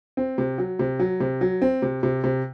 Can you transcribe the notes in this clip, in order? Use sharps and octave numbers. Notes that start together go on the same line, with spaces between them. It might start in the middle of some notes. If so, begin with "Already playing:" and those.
C4
C3
F#3
C3
F#3
C3
F#3
C4
C3
C3
C3